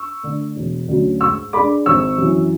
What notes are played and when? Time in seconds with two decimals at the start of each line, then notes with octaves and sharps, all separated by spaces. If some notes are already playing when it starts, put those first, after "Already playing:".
Already playing: C#6 E6
0.23 D3 A3
0.56 E1
0.88 D2 D3 F#3 C#4
1.20 G#2 C#6 E6
1.53 G#3 D4 B5 D6
1.86 G#1 C#6 E6
2.18 F#2 E3